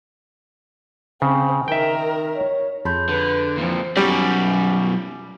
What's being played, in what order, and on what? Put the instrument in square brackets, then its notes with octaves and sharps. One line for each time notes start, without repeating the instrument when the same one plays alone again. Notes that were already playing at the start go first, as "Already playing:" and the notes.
[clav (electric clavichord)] C#3 [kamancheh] C4
[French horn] D#3 [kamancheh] A#4 [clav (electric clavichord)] E5 G5
[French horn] C#5
[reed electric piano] F2 A5 B5 [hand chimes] G#4 C6 G6
[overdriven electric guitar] D3 [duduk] B4
[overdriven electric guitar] F2 A#2 [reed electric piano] E3 [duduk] F3
[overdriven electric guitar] F#2 B2 [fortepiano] G3